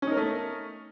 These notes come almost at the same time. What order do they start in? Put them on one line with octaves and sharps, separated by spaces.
C#4 D#4 A#4 A3